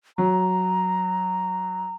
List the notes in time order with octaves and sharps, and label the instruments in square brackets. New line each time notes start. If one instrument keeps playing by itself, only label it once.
[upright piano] F#3 [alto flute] A#5